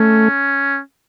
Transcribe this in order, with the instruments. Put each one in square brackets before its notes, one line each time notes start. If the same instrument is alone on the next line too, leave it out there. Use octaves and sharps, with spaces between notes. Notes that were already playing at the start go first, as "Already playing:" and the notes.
Already playing: [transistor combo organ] A3 [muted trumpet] C#4